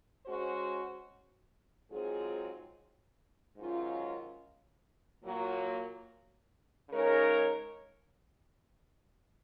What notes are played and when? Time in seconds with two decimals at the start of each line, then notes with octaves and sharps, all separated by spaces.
0.24 G#3 C#4 F#4 C5
1.90 G#2 F#3 C4 F4 G#4
3.57 G#2 D#3 F#3 C#4 F4
5.23 A#2 F#3 A#3
6.89 C#3 G#3 D#4 A#4 C#5